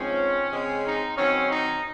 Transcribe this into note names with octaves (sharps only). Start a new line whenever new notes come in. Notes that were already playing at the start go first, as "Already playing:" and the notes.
Already playing: G#2 F3 C4 C#4
C#3 G#3 C4
D#4
D#3 F#3 C4 C#4
D#4